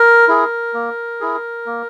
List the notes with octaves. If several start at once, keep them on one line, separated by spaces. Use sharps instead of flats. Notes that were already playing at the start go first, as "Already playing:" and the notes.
Already playing: A#4
E4 G#4
A#3
E4 G#4
A#3